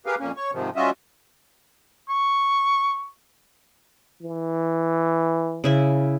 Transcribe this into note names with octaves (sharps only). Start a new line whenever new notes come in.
G4 G#4 A#4 B4 F5
F2 A#2 A#3 C#4
C#5 C#6
G#2 C3 D#3 F3
G3 C#4 F4 F#4 D#5 E5
C#6
E3
C#3 E4 E5